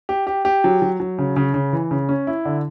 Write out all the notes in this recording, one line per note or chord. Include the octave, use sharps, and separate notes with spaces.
G4
G4
G4
F#3
F#3
F#3
C#3
C#3
C#3
E3
C#3
C#4
E4
D3